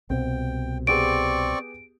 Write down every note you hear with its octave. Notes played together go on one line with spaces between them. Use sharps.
C2 B2 C4 G5
B3 C4 G4 G#4 D5 C#6 D7